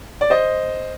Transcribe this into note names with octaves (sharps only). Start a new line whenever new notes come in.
D5
C5 D#5